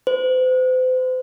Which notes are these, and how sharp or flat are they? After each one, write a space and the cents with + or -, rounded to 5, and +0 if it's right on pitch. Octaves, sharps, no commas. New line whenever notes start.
C5 -40